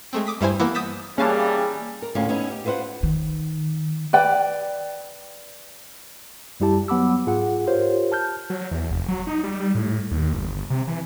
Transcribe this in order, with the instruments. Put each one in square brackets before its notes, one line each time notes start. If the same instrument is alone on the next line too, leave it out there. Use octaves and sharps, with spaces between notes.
[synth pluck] G#3 A3 C4
D6 D#6 B6
G2 G3 E4 C5 G#5
E3 A#3 B3 E4
D#6 E6 G6 A6 B6 E7
[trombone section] E3 G3 [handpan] A#3 [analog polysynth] C#4 F5 A5 [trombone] G#4
[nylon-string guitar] A#4
D2 A2 C#4 F4 F5
B3 C#4 D#4 E4
G4
F4 B4 C5 E5 F#5
[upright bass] D#3
[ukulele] B4 D5 G5
[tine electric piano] F#2 G3 E4 G4 A5
F#3 B3 F#5 B5 D6 E6
G#2 F4 G#4 F#5
F4 G4 A#4 C5 C#5
A5 F6 G6
[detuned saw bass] F#3
E2
F1
F#3
D#4
G3
G3
A2
D#2
G1
C3
E3